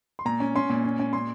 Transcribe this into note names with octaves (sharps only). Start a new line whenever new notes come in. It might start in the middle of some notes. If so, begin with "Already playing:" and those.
C6
A#2 A#5
C#4
C#4 C6
A#2
C#4
C#4
A#2 C6